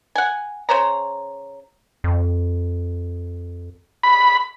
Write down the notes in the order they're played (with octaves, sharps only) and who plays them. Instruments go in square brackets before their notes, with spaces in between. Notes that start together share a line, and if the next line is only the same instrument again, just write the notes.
[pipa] F#5 G#5
C#3 C5 C#5 A#5
[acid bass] F2
[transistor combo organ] B5